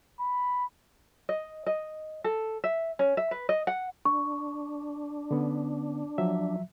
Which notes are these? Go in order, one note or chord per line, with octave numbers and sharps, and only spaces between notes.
B5
D#5
D#5
A4
E5
C#4
E5
B4
D#5
F#5
D4 C#6
D3 B3 C#4
F3 F#3 E5